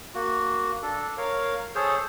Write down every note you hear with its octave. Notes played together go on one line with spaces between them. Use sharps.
A#3 F#4
D4 A4
A#4 C#5 F5
G#4 A4 C5 C#5